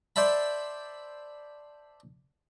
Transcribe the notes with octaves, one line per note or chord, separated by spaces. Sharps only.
C5 D5 E5 A5 B5